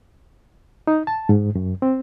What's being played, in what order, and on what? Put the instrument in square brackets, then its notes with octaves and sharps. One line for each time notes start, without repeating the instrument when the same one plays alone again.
[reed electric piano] D#4
A5
G#2
F#2
C4